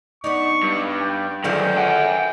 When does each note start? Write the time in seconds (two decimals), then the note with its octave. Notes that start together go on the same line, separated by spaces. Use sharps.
0.24 B3 D4 D#4 C#6
0.63 G2
1.02 G5
1.44 D3 D#3 F#3 F4 G#4 G5
1.77 F#5 G#5